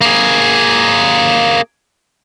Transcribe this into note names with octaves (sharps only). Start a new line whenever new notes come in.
A#3 G#4